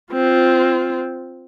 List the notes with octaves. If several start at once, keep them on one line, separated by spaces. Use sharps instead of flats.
C4 F4